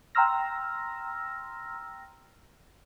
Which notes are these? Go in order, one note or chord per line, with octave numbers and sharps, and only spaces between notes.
G5 A#5 C6 E6 F6 A#6